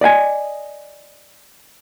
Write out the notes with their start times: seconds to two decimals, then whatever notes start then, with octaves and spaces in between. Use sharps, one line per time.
0.01 D5 D#5 G5 G#5